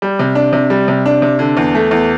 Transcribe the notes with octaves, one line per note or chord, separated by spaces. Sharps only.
G3
C3
D4
C3
G3
C3
D4
C3
D3
E2
A3
E2